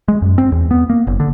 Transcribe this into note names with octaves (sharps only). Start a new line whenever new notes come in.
G#3
F#2
C4
E2
B3
A#3
F#1
D3